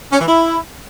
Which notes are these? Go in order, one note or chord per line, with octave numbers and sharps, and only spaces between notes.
C#4
E3
E4